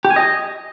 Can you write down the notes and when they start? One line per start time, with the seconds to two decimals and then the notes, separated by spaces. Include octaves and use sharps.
0.05 G4
0.10 G#5
0.16 D#5